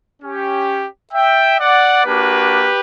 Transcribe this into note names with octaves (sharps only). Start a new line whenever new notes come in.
C#4 G4
E5 G5
D5 F#5
A#3 D4 F#4 G4 B4